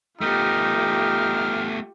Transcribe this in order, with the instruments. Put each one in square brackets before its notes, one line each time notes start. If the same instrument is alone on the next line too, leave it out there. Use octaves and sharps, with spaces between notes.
[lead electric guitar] A3 B3 [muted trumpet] D#4 [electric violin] F4 G4 [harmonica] F6